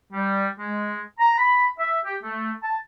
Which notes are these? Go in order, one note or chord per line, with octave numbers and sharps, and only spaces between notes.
G3
G#3
A#5
B5
E5
G4
A3
A5